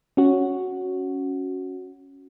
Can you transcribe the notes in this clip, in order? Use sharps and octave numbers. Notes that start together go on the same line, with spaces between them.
C#4 F#4